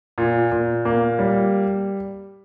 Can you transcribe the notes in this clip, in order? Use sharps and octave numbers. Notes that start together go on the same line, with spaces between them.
A#2
A#2
A#3
G3